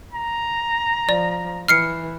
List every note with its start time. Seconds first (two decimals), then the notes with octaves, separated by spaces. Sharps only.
0.13 A#5
1.09 F3 D5
1.68 E3 F6 C7 C#7